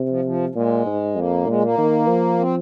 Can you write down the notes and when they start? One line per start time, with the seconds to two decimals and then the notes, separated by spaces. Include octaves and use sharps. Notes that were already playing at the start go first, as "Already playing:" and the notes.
Already playing: C3
0.09 F3
0.25 F3
0.49 F3
0.55 A#2 G#3
0.86 G#2
1.16 F2 A#3
1.46 A#2 G#3
1.62 A#3
1.78 D#3
2.08 F3
2.39 C4